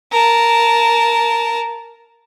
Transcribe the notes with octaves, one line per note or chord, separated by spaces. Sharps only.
A#4 A5